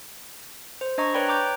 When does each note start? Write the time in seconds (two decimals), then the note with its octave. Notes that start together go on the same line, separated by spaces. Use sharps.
0.81 C5
0.98 D4 D#5 A#5 C#6
1.14 B4 C#5 D5 G5 B5
1.28 A#5 D6 G6